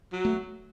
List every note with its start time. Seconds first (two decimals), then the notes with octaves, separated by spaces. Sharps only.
0.12 F#3
0.25 A3